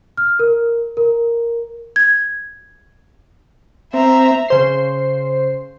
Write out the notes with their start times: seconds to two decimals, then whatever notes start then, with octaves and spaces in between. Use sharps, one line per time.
0.17 F6
0.39 A#4
0.97 A#4
1.96 G#6
3.93 C4 E5 A#5
4.48 C#3 C5 C7